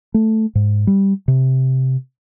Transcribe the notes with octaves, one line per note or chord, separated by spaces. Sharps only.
A3
G#2
G3
C3